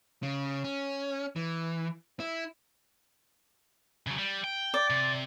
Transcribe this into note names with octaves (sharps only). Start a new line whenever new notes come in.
C#3
C#4
E3
E4
C#3 F#3
G3
G5
D5
C3